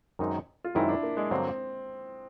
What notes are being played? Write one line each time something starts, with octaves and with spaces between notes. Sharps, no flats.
F#2 D#3 G#3 C4 D#4
F4
F#2 D#3 G#3 C4 D#4 E4
D4
A#3
G#3
G2 D3 F#3 A#3 C4